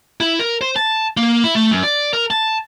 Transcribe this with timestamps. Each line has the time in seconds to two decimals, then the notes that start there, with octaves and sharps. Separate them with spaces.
0.20 E4
0.39 A#4
0.61 C5
0.76 A5
1.17 A#3
1.44 E4
1.55 A3
1.71 F#2
1.83 D5
2.13 A#4
2.30 A5